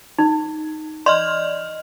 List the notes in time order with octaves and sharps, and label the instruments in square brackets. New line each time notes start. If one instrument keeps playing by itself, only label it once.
[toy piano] D#4
[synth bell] D5 D#5 F6 [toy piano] C6